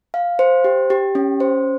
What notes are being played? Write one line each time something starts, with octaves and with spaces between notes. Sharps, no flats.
F5
C5
G4
G4
C#4
C5